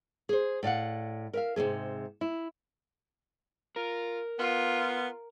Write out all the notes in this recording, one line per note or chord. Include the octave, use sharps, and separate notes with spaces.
G#4 C5
A2 D5 F5 F#5
A#4 E5 F5
G#2 C3 E3 A3 G#4
E4
F4 A#4
B3 F4